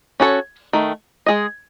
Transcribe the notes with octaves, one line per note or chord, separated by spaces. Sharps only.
C#4 F#4 A4 C#5
D#3 A3
G#3 C#4 G#4 D#5